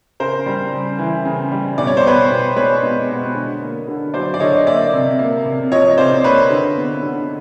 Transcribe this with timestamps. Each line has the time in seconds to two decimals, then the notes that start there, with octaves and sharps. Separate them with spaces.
0.20 C#3 A#4 C5
0.46 G3
0.73 C#3
0.99 E3
1.25 C#3
1.52 G3
1.78 B2 D5
1.87 C#5
1.97 C5
2.04 B3 B4 C#5
2.30 B2
2.56 G#3 B4 C#5
2.83 B2
3.09 B3
3.35 D3
3.61 A#3
3.88 D3
4.14 F#3 C5 D5
4.34 D5
4.40 D3 C#5 D#5
4.67 A#3 D5 E5
4.93 C3
5.19 A#3
5.45 C3
5.72 F3 C#5 D#5
5.98 C3 C5 D5
6.24 A#3 B4 C#5
6.50 D3
6.77 B3
7.03 D3